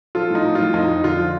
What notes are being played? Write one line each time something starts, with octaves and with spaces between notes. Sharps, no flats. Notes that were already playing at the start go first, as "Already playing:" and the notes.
F3 F4 A4
A2 D#4
F3
A2 F4
F2 D#4
F2
D3 F4
F3